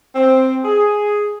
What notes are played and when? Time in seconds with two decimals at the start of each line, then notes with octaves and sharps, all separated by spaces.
0.15 C4
0.64 G#4